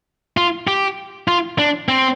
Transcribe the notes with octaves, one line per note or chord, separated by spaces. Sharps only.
F4
G4
F4
D4
C4